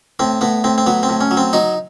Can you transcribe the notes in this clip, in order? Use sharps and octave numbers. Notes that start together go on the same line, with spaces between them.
A2 C4
A2 B3
A2 C4
C4
F#3 B3
C4
A2
C#4
F#3
C4
F#3 D#4